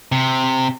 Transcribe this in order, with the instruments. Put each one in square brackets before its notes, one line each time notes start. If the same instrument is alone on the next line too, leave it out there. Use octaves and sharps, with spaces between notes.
[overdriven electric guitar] C3